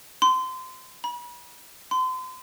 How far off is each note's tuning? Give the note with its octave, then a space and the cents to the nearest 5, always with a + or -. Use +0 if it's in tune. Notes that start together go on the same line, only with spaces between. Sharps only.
C6 -25
B5 -40
C6 -35